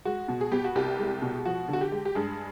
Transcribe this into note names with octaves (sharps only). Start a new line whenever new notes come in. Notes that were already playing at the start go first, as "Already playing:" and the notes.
G#3 F#4
B2
G#4
B3 G4
F#4
C2 G4
G#3
B2
F3 F#4
D3 F#4
G4
G#3
G4
G2 G#3 G#4